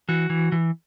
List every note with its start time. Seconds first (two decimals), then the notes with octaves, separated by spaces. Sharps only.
0.09 E3 F#4
0.30 E3
0.52 E3